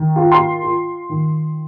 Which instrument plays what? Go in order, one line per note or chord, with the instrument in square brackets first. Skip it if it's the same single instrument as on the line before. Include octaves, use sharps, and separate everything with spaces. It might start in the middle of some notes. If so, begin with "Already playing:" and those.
Already playing: [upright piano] D#3
F4
C6
F4
D#3